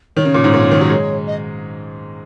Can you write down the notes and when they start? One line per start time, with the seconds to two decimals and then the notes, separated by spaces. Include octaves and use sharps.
0.16 D#3 C#5
0.25 C#3
0.34 A#2
0.44 G#2
0.54 A#2
0.63 C#3
0.71 D#3
0.81 F#3
0.90 G#3
1.27 D#5